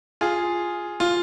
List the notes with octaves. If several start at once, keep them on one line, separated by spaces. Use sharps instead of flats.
F4 G#4
F4